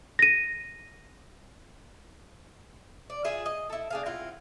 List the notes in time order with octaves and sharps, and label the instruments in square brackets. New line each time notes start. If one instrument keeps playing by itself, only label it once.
[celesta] A#6 D#7
[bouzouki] D5
F4 G#4 E5
D#5
E4 A4
D4 G#4 F5
C4 E4 F4 F#5